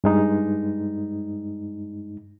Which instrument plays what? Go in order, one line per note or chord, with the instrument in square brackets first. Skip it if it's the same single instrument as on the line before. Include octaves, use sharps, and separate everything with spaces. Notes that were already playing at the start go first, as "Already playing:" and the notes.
[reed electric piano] G2 G#3 D#4